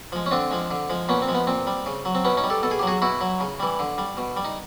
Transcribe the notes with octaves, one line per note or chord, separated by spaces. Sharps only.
F3 G#3
C#4
D3 C4 D4
F3 G#3
D3
F3 G#3
A#2 B3 C#4
C4
F3 G#3
B3
A#2 C4
G3
C#3
F#3
C4
B2 B3 C#4
C#4 D#4
G3
G4 A4
B2 A4
G#4
G4
F#3 F#4 G#4
B2 E4 F#4
F#3
C#3
E3 G3
D3
G3
B2
G3
D#4